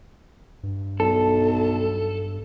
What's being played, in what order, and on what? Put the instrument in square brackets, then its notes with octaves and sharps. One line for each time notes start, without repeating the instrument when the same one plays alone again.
[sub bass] G2
[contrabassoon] B1 [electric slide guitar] A4